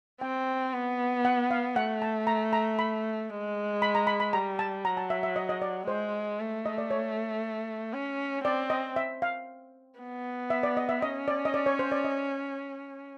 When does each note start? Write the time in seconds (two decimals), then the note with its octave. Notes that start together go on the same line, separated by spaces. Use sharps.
0.21 C4 G5
0.73 B3
1.25 F#5
1.51 F5
1.76 A3 F#5
2.02 A5
2.27 A#5
2.53 A#5
2.79 B5
3.30 G#3
3.82 B5
3.95 A#5
4.07 B5
4.20 B5
4.33 G3 A#5
4.59 A5
4.85 F#3 A#5
4.97 A5
5.10 E5
5.23 E5
5.36 D#5
5.49 D#5
5.62 D5
5.87 G#3 C5
6.40 A3
6.66 D#5
6.78 D5
6.91 C#5
7.93 C#4
8.45 C4 D5
8.70 D#5
8.96 E5
9.22 F5
10.00 B3
10.50 E5
10.63 D5
10.77 D#5
10.89 E5
11.02 C#4 D#5
11.28 D5
11.45 D#5
11.54 D5
11.66 C#5
11.79 C5
11.92 D5
12.04 D#5